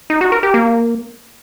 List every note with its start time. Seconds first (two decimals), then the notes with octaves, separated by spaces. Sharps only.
0.10 D#4
0.21 F#4
0.32 A#4
0.43 G4
0.54 A#3